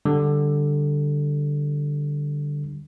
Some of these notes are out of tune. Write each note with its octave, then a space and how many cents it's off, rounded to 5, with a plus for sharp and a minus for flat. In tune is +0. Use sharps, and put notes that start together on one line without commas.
D3 +0 G3 +0